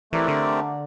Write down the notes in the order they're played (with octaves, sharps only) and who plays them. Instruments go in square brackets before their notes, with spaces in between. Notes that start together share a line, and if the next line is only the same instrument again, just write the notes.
[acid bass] E3 [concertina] A3 C4 G4 A#4 D5
[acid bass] D3